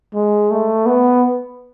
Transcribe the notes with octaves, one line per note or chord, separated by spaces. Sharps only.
G#3
A3
B3